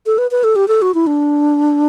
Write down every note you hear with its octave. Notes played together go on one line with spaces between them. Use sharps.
A4
B4
B4
A4
G4
A4
F#4
E4
D4